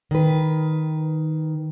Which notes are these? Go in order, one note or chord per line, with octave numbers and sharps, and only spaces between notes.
D#3 B4